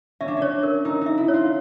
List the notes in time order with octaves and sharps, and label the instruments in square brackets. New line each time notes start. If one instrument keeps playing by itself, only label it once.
[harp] C#4 [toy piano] E5
[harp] D4
C#4
[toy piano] C#5
A#4
[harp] D#4 [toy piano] A#4
[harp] D#4 [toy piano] E5
[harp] E4
[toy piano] C#5
[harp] F4